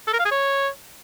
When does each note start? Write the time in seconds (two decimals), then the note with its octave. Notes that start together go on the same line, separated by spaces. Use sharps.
0.07 A4
0.13 A#4
0.19 F5
0.25 G#4
0.31 C#5